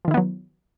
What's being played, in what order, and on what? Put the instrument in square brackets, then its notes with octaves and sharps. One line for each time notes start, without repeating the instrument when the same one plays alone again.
[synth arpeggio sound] F3
D#3
E4
B3
F#3